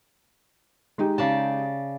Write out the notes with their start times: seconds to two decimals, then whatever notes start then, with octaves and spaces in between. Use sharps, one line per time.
0.98 G#3 D#4 G4
1.18 C#3 D5 A5